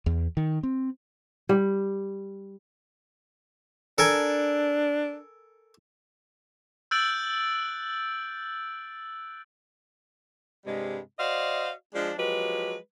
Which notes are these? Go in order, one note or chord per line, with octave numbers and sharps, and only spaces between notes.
E2
D#3
C4
G3
D4 A4 A#4 G#5
E6 F#6 G6 A6 D7 F#7
G2 C3 G3 G#3
F#4 C5 D5 D#5 F5
F3 G#3 D4
F3 F#3 G#3 G4 B4